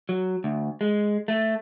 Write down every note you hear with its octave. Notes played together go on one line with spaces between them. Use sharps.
F#3
D2
G#3
A3